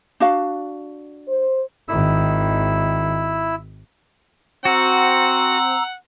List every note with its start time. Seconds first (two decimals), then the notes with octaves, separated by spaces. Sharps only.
0.20 D4 F#4 F5
1.29 C5
1.88 G#1 D#3 E4 E6
4.65 C4 F#4 F#5 A#5 E6